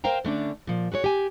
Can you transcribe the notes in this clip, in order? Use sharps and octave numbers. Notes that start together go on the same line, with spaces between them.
A#4 C5 F5 G5 A#5
D3 A3 C#4 D4
A#2 F3
F#4 G#4 B4 C#5
G4 G#5